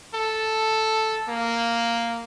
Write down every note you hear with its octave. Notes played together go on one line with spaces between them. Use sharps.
A4
A#3